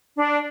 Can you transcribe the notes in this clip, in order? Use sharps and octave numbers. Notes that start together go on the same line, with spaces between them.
D4